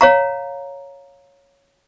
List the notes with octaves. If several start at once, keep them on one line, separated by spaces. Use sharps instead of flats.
C#5 F5 A#5